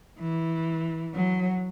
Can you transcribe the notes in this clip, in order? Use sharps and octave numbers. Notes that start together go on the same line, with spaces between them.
E3
F#3